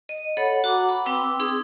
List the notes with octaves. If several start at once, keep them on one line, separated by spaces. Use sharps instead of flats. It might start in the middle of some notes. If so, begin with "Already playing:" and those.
D#5
A4 C#5 F#5 B5
F#4 F#5 A#5 D6
B5
C4 B4 G5 C6 D6 E6
C4 D#4 G#4